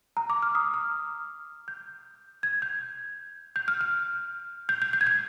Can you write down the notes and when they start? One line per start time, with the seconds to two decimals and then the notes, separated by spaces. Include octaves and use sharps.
0.17 A#5
0.30 D6
0.42 F6
0.55 D#6
0.74 F6
1.68 G6
2.43 G#6
2.62 G6
3.56 G6
3.68 F6
3.81 F6
4.69 G6
4.82 G6
4.93 G6
5.01 G#6
5.07 G6